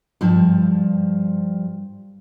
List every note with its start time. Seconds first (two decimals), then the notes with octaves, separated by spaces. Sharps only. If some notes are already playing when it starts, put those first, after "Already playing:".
0.21 G2 F3